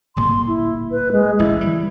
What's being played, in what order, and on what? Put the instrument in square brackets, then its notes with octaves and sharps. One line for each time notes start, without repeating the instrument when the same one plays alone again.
[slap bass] D1 G1 A#2 [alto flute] C6
[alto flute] E4
B4
G#3
[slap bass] D1 A1 [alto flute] E4
[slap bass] E3 F3 G3